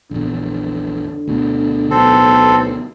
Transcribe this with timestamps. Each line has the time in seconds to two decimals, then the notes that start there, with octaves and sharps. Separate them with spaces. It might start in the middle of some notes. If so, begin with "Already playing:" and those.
0.11 A#1 E2 D3
1.28 D2 B2
1.91 B1 C4 A4